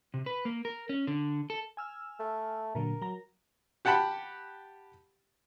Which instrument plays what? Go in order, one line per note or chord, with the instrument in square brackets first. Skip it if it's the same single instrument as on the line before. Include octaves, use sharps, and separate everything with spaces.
[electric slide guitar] C3
B4
A#3
A#4
C#4
D3
A4
[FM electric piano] G#5 E6 F6
[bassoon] A3
[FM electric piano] A#2 D3 F#3 [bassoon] A#4
[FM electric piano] F#3 A#5
[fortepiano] G4 F#5 G5 A5 B5